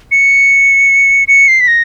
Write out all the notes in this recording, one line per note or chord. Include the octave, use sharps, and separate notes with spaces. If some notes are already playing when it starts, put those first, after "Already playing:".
C#7
C#7
C7
B6
A#6